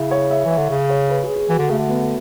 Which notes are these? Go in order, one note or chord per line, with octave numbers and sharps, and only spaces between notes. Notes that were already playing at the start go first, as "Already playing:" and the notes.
Already playing: C#3 E4
C#5
E5
E3
E5
D3
C#3
C#5
B4
G#4
G#4
E3 F#4
D3
C#3 A3
D3
B3